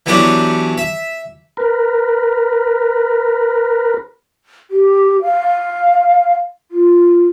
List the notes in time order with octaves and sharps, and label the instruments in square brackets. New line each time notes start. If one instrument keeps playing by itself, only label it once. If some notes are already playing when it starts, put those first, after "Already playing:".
[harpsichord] E3 F#3 B3 D4 G4
E5
[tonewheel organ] A#4 B4
[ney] G4
F5
F4